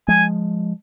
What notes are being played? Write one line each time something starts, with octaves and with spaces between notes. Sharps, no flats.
F3 G#3 G#5